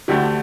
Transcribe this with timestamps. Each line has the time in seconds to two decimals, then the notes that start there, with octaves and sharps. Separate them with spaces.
0.08 D2 D3 A3 G4